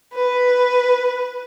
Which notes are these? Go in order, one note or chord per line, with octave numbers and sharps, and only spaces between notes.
B4